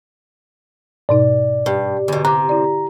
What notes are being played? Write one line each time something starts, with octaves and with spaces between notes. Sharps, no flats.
G#2 B2 D#4 D5
G2
E2 B2 D3
C3 A#5 D6 F#6
E4 D5